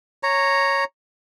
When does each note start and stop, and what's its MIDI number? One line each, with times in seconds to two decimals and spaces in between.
0.23 0.84 73
0.23 0.84 82